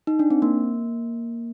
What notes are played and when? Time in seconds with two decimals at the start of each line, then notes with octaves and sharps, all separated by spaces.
0.07 D#4
0.19 D4
0.30 C4
0.42 A#3